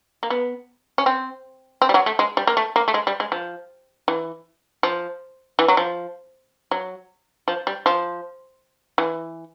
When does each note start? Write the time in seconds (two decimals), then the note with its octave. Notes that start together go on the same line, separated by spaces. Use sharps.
0.23 A#3
0.30 B3
0.98 C#4
1.06 C4
1.82 C4
1.89 G3
1.94 F#3
2.06 A3
2.19 G#3
2.37 G3
2.47 A#3
2.57 A3
2.76 A#3
2.88 A3
2.94 G#3
3.07 G3
3.20 G#3
3.32 F3
4.08 E3
4.83 F3
5.59 E3
5.68 F#3
5.77 F3
6.71 F#3
7.48 F3
7.67 G3
7.86 F3
8.98 E3